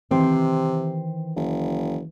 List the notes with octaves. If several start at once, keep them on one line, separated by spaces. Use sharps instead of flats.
C3 D#3 E3 C4
F#1